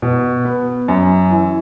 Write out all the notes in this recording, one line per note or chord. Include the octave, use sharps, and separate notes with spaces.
B2
B3
F#2
E3